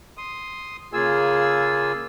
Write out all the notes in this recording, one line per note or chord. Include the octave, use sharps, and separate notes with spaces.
C6 D#6
C#3 A#3 F4 G#4 G#5 E6